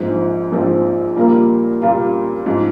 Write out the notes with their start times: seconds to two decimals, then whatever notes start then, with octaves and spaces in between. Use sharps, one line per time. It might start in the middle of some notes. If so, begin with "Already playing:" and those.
Already playing: A#1 G#2 F3 C4
0.52 A#1 G#2 F3 C4
1.16 A#2 G3 A#3 F4 A#4
1.81 A#2 G3 A#3 F4 A#4
2.46 G#2 F3